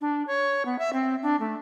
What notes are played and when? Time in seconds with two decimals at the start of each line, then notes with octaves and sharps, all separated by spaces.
0.01 D4
0.27 C#5
0.65 B3
0.79 E5
0.93 C4
1.23 D4
1.40 A3